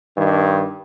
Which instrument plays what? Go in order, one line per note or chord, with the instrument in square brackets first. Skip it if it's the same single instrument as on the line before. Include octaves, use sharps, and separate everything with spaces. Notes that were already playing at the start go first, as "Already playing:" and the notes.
[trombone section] G2 D#3